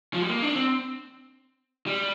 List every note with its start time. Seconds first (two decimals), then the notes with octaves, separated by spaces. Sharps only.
0.14 F3
0.22 G3
0.30 A#3
0.42 D4
0.56 C4
1.87 G3